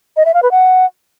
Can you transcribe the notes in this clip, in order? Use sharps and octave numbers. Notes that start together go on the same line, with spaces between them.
D#5
E5
F5
B4
F#5